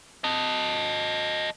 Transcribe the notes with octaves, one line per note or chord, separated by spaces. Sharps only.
A4 D#5